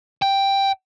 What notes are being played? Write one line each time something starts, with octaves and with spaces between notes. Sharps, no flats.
G5